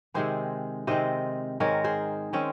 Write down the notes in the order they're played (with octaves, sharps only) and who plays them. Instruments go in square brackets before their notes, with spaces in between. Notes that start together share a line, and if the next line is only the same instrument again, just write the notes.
[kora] C3 D#3 G#3 C4 G#4 C5
C3 D#3 G#3 C4 C5 D#5
G#2 D#3 G#3 C4 A#4 C#5
G#4 C5
D#3 G#3 C4 C#4